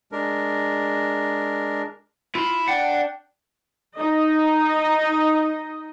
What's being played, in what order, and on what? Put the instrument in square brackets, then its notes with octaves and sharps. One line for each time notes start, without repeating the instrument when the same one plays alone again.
[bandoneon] G#3 D4 A#4
[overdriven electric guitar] E4 [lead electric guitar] F4 C6
[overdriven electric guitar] D4 [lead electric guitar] F#5 [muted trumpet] G5
[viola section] D#4 D#5